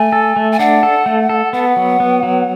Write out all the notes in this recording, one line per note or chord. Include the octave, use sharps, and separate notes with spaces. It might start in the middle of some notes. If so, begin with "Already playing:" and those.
Already playing: A3 G#5
A4
A3
G#5
D4 F#5
A4
A3
A4
B3 F#5
F#3
B3
F#3